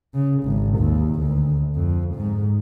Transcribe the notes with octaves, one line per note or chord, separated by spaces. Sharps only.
C#3
G#1
D#2
D2
F2
G#2